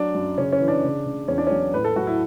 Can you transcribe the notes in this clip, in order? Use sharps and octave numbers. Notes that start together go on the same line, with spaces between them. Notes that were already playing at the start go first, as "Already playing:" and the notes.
Already playing: F#3 D4
F#2
C#3 C#4
C#4
E3
D4
C#3
C#3
E2 C#4
D4
F#3 C#4
A2 B4
A4
F#3 F#4
E4